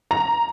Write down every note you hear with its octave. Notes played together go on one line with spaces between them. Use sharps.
A#5